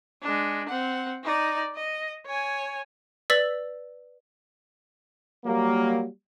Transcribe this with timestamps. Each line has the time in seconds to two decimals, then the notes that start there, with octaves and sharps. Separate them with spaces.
0.22 G#3 D4
0.69 C4 F#5
1.24 D#4 D5
1.75 D#5
2.26 C#5 G#5
3.30 B4 D5 E6 A6 B6 F#7
5.45 F#3 G3 A#3